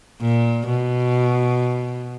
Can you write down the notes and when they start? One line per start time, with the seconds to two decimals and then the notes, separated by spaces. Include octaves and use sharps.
0.21 A#2
0.67 B2